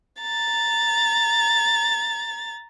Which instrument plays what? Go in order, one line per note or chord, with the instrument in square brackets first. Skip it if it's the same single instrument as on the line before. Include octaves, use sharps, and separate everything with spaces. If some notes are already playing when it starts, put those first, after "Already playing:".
[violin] A#5 A6